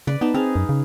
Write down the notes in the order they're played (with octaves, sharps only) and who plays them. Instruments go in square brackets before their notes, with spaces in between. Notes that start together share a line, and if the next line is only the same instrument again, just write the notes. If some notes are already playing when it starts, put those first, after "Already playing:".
[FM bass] C#3 [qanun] B4 D5
[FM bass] B3 [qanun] D#4 A5
[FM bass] C4 [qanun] G#4 F5
[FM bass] F#2
C#3